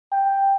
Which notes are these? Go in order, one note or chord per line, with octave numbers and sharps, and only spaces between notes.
G5